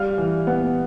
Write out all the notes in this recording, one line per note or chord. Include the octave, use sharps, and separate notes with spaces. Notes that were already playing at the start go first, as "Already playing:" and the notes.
Already playing: G3 F5 F6
E3
B3